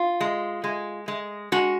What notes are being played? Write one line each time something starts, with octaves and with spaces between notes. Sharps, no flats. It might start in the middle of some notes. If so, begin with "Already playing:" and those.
Already playing: F4
G#3
G#3
G#3
G#3 F#4